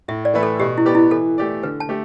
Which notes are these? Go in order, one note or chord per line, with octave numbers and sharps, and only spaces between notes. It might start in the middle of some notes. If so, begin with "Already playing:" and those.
A2 E5
D5
E3 A3 E4 B4
A4
B2 G4
E4
B3 G4 B4 D5
E4
E3 A4
A3 G4 D5
D3 B4
A5
A3 G4